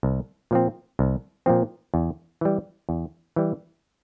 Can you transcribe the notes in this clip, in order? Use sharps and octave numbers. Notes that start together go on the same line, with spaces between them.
C2
A#2 F3 C4
C2
A#2 F3 C4
E2
E3 G3
E2
E3 G3